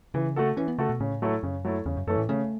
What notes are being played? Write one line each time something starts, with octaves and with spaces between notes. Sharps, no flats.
C#3 E3
A3 F#4 A4
E3 C#4
B3
C#3 A3 F#4 A4
B2
A2 C#3
F#3 A3 E4 A4
F#2 C#3
F#3 A3 E4 A4
E2 C#3
F#2
F#2 E3 A3 C#4 A4
A2
C#3 A3